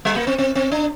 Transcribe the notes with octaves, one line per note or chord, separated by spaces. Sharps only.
G3
A#3
C4
C4
C4
D4